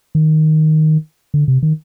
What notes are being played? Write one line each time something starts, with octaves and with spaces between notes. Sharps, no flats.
D#3
D3
C3
D#3